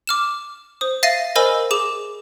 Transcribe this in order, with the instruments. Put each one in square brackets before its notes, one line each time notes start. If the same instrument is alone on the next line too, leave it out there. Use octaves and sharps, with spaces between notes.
[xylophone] D6 F6 E7
C5 D#6
E5 F5 A6 A#6 C7 D#7
A#4 C5 D#5 G#5 B5 E6
G#4 D6 E7